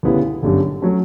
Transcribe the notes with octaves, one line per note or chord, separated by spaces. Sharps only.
D2 C#3 G3 B3 E4
G1 F#2 D3 G3
F#3 A3 C#4